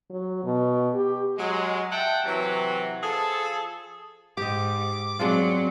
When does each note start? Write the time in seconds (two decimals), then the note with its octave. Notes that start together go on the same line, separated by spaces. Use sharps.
0.10 F#3
0.44 B2
0.94 G4
1.38 F#3 G#3
1.91 E5 F#5 G5 A5
2.25 C3 E3 F#3
3.03 F3 G#4 A4
4.37 G#2 G4 D#5 D6
5.19 F#3 G#3 C4 D4 F4